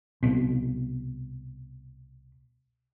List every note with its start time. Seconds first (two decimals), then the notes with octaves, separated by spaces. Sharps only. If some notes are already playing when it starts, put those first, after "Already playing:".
0.23 C2 B2